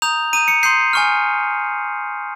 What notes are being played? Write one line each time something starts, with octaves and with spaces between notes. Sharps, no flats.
A#5 D#6 G6 F7
A#5 D#6 G6 D#7
C#7
C6 D#6 G6 C7
G#5 C#6 F6